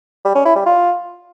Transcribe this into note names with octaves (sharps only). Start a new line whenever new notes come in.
G3
C#4
E4
G3
F4